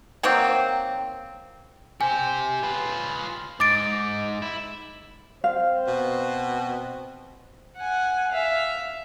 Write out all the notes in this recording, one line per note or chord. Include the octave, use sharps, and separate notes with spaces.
D#3 F#3 A#3 C4
G4 C5 G#5
F4 B4
G#2 D6 A6 D7
E4
C4 C5 F5
B2
F#5 G#5
E5 F5